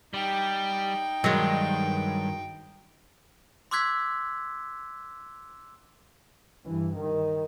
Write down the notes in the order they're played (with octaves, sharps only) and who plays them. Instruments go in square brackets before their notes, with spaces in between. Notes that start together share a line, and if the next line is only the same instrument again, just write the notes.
[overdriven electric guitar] G3 [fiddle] D#4 G5
[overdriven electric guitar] G2 [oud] D#3 [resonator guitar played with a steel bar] F#3 G#3
[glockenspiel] C6 D6 E6 F#6 G#6 B6
[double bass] G2 E3
D#3